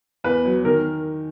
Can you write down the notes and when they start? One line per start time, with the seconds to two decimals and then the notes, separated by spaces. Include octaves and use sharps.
0.24 E2 B4
0.45 F#3
0.64 D#3 A#4